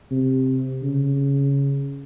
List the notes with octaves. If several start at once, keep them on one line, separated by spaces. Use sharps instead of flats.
C3
C#3